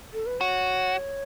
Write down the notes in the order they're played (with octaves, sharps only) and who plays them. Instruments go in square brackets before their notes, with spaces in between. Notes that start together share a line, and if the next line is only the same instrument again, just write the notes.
[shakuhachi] A4
B4
[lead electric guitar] F#4 [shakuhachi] C#5